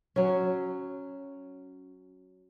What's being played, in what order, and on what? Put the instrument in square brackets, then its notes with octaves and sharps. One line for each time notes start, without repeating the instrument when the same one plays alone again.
[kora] F#3 C#4